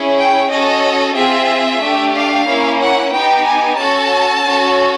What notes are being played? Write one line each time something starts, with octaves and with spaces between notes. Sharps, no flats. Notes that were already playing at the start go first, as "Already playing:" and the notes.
Already playing: C#4 E4 G#4
G5
C#4 F#4 A4 D#5
C4 F4 G#4 E5
A3 D4 G4
F5
A#3 C#4 E4
F#5
B3 D#4 G4 G5
G#5
C#4 F#4 A4 A5
C#4 F#4 A4